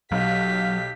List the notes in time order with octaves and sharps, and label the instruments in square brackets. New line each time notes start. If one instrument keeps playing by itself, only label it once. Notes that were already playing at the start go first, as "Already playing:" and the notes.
[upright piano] B1 [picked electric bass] F#3 [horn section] G4 F5 [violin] B6